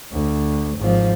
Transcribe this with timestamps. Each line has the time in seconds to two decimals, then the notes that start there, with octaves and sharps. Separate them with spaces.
0.12 D2
0.78 G#1 F3